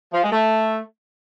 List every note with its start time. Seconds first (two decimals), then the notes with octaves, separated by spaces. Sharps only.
0.13 F3
0.23 G#3
0.32 A3